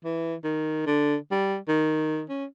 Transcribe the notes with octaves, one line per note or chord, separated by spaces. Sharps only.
E3
D#3
D3
G3
D#3
C#4